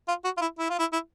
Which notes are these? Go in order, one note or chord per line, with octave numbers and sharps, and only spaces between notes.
F4
F#4
F4
E4
E4
F4
E4
E4